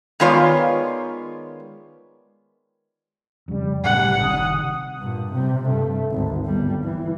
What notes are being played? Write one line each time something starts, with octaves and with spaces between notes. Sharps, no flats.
D#3 G#3 B3 F4 C#5 D5
F2 C#3 G3
B1 A2 C#3 G3 F#5
F#1 C3 D#3 D#6
G2 A#2
C3 G3
G2 A3
G#1 D2
G1 G3
E3